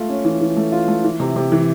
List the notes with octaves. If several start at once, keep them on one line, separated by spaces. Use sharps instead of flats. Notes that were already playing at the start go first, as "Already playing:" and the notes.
Already playing: A3 F4
C#4
E3
E3
A3
F4
A3
E3
C3
C3
E3